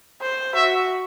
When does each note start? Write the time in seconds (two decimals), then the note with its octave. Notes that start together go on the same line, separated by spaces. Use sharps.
0.21 C5
0.55 F#4 E5